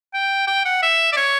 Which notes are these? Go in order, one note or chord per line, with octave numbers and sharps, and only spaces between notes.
G5
G5
F#5
E5
D5
C#5